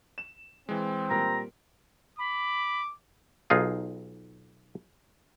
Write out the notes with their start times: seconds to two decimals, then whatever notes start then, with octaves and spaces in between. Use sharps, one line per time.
0.18 E7
0.69 E3 G#3 C4
1.10 A#2 G3 A#4 A#5
2.19 B5 D6
3.50 B1 D#4 F4 G#4